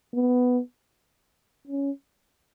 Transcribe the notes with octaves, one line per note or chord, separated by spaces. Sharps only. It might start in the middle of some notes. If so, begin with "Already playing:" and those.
B3
C#4